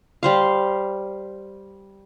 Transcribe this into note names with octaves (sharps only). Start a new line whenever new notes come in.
G3 C5 F5